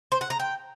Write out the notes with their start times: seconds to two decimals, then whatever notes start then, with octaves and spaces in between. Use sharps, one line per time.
0.12 C5
0.21 F#5
0.30 A#5
0.40 G5